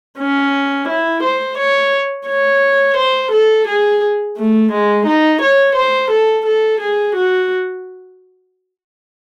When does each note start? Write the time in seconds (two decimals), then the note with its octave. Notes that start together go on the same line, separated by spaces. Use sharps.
0.19 C#4
0.88 E4
1.23 C5
1.58 C#5
2.27 C#5
2.97 C5
3.31 A4
3.67 G#4
4.37 A3
4.72 G#3
5.06 D#4
5.42 C#5
5.76 C5
6.11 A4
6.46 A4
6.81 G#4
7.15 F#4